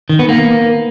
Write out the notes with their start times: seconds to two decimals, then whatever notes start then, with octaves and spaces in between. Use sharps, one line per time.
0.09 D#3
0.19 B3
0.29 A#3